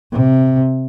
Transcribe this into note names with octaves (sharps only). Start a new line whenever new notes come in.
C3